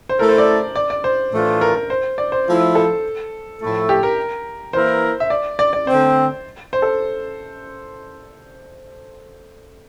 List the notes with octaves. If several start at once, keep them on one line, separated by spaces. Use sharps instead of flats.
C5
A3 E4 A4 A#4
C5
D5
D5
D5
C5
A2 E3 A3 D4 F4
A#4
A#4
C5
D5
C5
F3 A3 E4
A4
A2 F3 A3 E4 A4
G4
A#4
E3 A#3 E4 A#4 C5
E5
D5
D5
D5
D3 A3 C4 C5
C5
A4